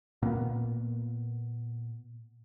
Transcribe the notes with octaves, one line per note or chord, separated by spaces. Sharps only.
A#2 A#3 B3